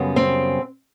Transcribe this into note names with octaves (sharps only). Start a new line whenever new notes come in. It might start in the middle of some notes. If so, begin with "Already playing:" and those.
Already playing: F#2 C#3 G3 B3
C4